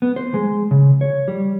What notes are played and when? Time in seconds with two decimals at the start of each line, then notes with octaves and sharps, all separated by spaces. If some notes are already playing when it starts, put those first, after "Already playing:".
0.02 B3
0.16 C5
0.34 G#3
0.71 C#3
1.01 C#5
1.28 G3